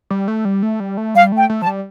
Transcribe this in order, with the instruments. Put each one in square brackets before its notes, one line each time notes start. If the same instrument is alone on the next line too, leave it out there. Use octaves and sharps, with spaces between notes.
[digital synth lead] G3
A3
G3
A3
G3
A3
[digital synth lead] G3 [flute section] F5
[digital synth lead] A3
[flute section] G5
[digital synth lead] A3
[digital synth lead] F3 [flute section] A5
[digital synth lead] G3